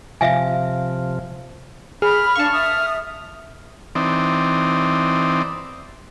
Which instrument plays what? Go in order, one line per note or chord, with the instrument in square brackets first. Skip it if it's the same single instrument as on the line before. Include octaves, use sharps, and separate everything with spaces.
[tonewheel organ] C3 F3 [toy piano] E5 F5 G#5
[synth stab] G#4 [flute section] B5 [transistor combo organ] F6
[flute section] D4 F5 [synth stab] A5 C#6
[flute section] E5 D#6
[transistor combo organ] E3 C4 D#4 D5